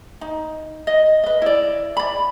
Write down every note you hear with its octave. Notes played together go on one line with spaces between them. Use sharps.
D#4
D#5
B4 D#5
E4 D5
D5 B5